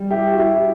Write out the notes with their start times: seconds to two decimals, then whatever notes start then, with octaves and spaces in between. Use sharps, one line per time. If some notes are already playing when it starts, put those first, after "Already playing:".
Already playing: G3
0.10 E4 G4
0.33 F#4
0.38 E4 G4
0.54 E4